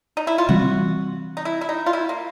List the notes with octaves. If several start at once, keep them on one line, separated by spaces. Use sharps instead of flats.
D#4
E4
F4
C3 E3 G3 C4 F#4
D#4
E4
E4
D#4
F4
E4
A#3